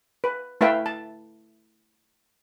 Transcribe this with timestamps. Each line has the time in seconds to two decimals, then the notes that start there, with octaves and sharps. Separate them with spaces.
0.24 B4
0.61 A3 E4 B4 E5 F5 G5
0.86 A5